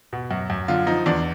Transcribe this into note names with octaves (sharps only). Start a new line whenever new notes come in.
B2
F#2
F#2
D3 F4
F3 D#4
E2 D4